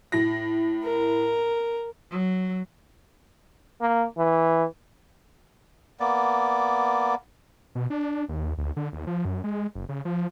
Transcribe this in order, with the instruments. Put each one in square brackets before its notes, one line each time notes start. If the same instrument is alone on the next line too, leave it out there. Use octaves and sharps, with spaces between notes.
[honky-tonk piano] A2 A#6
[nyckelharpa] A#4
[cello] F#3
[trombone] A#3
E3
[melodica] A#3 B3 D5
[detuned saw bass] B2
D4
D#2
D2
D3
D#2
F3
F#2
G#3
F#1
C#3
F3